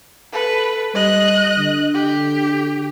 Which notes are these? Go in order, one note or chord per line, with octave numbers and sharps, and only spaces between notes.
A4 B4
G3 D#5 F#6
D3
G4